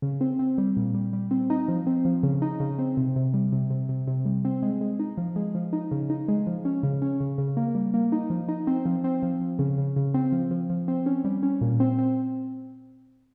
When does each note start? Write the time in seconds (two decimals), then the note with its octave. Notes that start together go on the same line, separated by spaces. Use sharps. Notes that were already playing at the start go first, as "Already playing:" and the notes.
0.02 C#3
0.21 C4
0.39 C4
0.58 G3
0.77 A#2
0.94 G3
1.13 G3
1.31 C4
1.50 D#4
1.68 F3
1.87 C4
2.05 F3
2.23 C#3
2.42 D#4
2.60 C#3
2.79 C4
2.97 C3
3.16 C3
3.34 G3
3.52 C3
3.70 C3
3.89 C3
4.07 C3
4.26 G3
4.45 C4
4.63 G#3
4.81 G#3
4.99 D#4
5.17 F3
5.36 G#3
5.55 F3
5.73 D#4
5.91 C#3
6.10 D#4
6.28 G#3
6.47 F3
6.65 C#4
6.83 C#3
7.02 C#4
7.20 C#3
7.38 C#3
7.57 A#3
7.75 G3
7.94 A#3
8.12 D#4
8.30 F3
8.48 D#4
8.67 C4
8.86 F3
9.04 C4
9.23 F3
9.41 F3
9.59 C#3
9.78 C#3
9.96 C#3
10.14 C4
10.32 F3
10.51 F3
10.70 F3
10.88 C4
11.06 C#4
11.25 G3
11.43 C#4
11.61 A#2
11.80 C4
11.98 C4